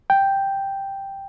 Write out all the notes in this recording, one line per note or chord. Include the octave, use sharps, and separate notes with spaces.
G5